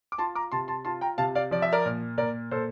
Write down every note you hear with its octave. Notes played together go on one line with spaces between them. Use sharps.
D6
F4 A5 C6
A#5 D6
C3 A5 C6
A5 C6
F4 A5 C6
G5 A#5
C3 F5 A5
D5 F5
F3 D5
E5
A#4 D5
A#2
A#2 A#4 D5
A#2 A4 C5